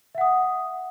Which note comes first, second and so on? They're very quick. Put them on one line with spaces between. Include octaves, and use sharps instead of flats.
E5 F#5 D#6